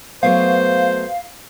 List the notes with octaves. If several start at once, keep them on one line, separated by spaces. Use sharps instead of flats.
F#3 A3 B3 C5 F5